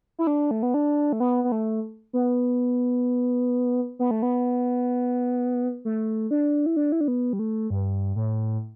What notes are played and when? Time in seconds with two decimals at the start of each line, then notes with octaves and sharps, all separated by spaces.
0.19 E4
0.27 D4
0.51 A3
0.63 B3
0.74 D4
1.13 A3
1.20 B3
1.44 B3
1.52 A3
2.13 B3
3.99 B3
4.11 A3
4.22 B3
5.85 A3
6.31 D4
6.66 E4
6.77 D4
6.92 E4
7.01 D4
7.08 B3
7.33 G3
7.39 A3
7.70 G2
8.16 A2